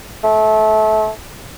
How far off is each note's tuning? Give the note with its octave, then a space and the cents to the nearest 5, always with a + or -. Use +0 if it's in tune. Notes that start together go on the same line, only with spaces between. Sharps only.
A3 -25